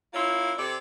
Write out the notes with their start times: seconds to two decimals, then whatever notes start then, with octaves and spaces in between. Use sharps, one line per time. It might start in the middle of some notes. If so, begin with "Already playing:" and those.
0.13 A#3 C#4 E4 F4
0.58 C3 A4 D5